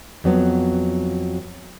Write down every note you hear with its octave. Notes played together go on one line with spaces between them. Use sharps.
F2 F#3 B3